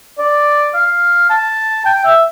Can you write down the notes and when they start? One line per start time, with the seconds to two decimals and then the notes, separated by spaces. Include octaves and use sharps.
0.19 D5
0.74 F5
1.30 A5
1.86 G5
2.05 E5